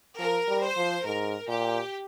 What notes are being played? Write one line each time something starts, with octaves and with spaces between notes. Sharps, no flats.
F3 A#4
G3
C5
F3
G#2 A#4
A#2 G4